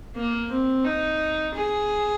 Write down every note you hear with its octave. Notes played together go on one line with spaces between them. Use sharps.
A#3
C4
D#4
G#4